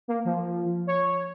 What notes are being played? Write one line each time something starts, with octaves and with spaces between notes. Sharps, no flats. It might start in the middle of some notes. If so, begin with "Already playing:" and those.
A#3
F3
C#5